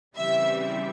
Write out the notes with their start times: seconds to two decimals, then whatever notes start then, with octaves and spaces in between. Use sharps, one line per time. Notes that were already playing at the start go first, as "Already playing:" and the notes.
0.16 C#3 E3 G3 C4 E5